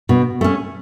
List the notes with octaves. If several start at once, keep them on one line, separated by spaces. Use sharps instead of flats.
B2
A3 C#4